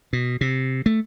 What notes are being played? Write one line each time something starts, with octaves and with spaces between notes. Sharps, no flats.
B2
C3
A3